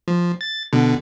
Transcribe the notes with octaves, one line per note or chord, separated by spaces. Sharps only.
F3
A6
B2 D3